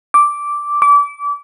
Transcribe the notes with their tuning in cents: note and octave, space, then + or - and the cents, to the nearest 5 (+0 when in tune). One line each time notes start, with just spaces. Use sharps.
D6 -5
D6 -30